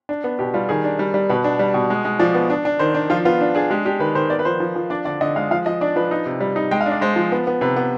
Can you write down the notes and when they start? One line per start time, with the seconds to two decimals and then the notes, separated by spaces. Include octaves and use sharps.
0.09 D4
0.24 B3
0.39 B2 G4
0.54 G3 F4
0.69 D#3 G#4
0.84 D4
0.99 G3
1.14 G3
1.29 B2 B4
1.44 D4
1.59 G3
1.74 B2
1.90 G#3
2.05 G#3
2.19 F3 D5
2.35 B3
2.50 D4
2.65 D4
2.79 D#3 C5
2.94 D4
3.10 F3 F4
3.25 B3 F4
3.41 D4
3.55 D4 G#4
3.70 G#3 G4
3.85 D4 G4
4.00 D#3 B4
4.15 D#3 C5
4.30 B3 D5
4.39 B4
4.45 F3 C5
4.60 F3
4.76 F3
4.90 D4 D5
5.05 D3 D5
5.21 D3 D#5
5.36 G#3 F5
5.51 F3 F5
5.66 F3 D#5
5.81 D4 D5
5.96 F3 B4
6.11 D#4
6.26 C3
6.41 G3
6.56 D#4
6.71 G#3 G5
6.81 F5
6.86 D4
6.91 D5
7.01 G#3 C5
7.16 F3
7.32 B3
7.47 B3
7.61 C3 B4
7.77 B3